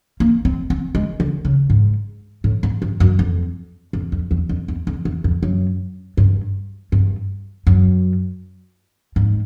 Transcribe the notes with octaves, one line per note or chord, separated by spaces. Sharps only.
A#3
C4
C4
G#3
D3
C#3
G#2
A2
G#2
G2
F#2
F2
F2
F2
E2
F2
E2
F2
E2
F2
F#2
G2
G2
F#2
G#2